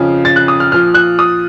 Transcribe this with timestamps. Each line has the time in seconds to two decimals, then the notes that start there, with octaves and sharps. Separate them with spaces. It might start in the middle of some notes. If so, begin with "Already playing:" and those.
Already playing: F2 C#3 F3
0.25 A6
0.36 F#6
0.48 D#6
0.60 F6
0.71 A#2 F3 F6
0.94 F#6
1.19 D#6